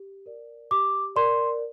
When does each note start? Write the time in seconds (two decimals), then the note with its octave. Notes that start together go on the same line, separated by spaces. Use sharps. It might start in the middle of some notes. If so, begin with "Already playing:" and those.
Already playing: G4
0.26 A#4 D5
0.71 G4 D6
1.16 A#4 D5 C6